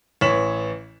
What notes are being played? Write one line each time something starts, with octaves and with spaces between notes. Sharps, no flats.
A1 E3 C#5 B6 E7 F#7